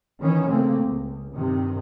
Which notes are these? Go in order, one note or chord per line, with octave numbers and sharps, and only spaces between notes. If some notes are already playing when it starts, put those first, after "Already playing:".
D#3 E3 C#4
C#3 A3 A#3 C4
C#2
G2 C3 D#3